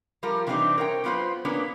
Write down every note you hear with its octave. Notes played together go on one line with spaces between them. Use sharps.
F3 G3 F4 A#4
C3 E3 G3 C4 D4 D#4
A#4 C5 C#5 F#5 G5
F#3 B3 F4 B4 C5
A#3 B3 C#4 D4